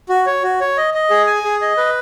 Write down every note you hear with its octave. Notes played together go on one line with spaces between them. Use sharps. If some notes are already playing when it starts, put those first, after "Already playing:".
F#4
C#5
F#4
C#5
D#5
D#5
G#4
G#5
G#4
D#5
B4